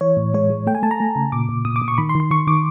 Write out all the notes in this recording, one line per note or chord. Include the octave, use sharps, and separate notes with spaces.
E3 C#5
A2
G#3 C#5
G#3
A3 G5
G#5
A3 A5
A#5
A3
C#3
A#2 D6
A#2
A#2 D#6
D6
A#2
C#6
D#3 B5
C6
D#3
C6
D#3 C#6
D#3 D6